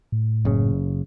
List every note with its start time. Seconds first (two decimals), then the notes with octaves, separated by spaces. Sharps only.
0.12 A2
0.45 F#1 C#3